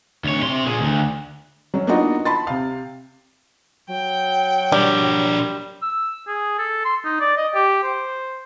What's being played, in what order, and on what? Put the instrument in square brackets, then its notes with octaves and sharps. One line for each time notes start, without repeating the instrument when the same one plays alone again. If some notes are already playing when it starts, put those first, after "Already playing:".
[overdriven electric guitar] D2 C#5
C3 C6
A#2 G#4
D2
[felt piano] F#3 C#4
A#3 B3 D4 D#4 F4 F#4
A5 B5 C6 A6
C3 F5
[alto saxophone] F#3 [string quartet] G5
[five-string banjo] G3 [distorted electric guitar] D4 A#4
[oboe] E6
G#4
A4
C6
D#4
D5
D#5
G4
C5